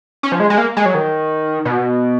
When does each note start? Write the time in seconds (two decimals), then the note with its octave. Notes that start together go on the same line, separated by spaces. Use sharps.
0.23 C#4
0.32 F3
0.40 G#3
0.50 G#3
0.58 A#3
0.77 G#3
0.86 F#3
0.95 D#3
1.65 B2